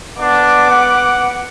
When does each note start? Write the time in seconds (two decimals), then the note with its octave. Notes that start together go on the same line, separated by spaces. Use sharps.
0.20 B3 D4 D6
0.70 F#5